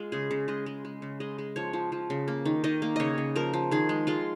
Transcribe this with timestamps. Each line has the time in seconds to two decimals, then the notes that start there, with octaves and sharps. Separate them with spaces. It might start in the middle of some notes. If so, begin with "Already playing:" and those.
Already playing: G#3 F4
0.12 C#3 G#4
0.31 C#3
0.48 G#3 D#5
0.66 G#3
0.85 G#3
1.02 C#3
1.20 G#3 D#5
1.38 G#3
1.56 F3 C#5
1.73 F3
1.92 F3
2.10 C#3
2.28 A#3
2.45 D#3
2.64 D#3 D#5
2.82 A#3
2.96 C#3 C#5 D#5
3.18 C#3
3.36 F3 A#4
3.53 F3
3.71 D#3 G#4
3.89 G#3
4.07 G#3 F4